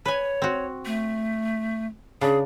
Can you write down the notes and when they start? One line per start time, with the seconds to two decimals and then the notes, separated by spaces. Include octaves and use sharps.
0.06 B4 C#5 G#5
0.42 C4 F#4
0.85 A3
2.21 C#3 D4 G#4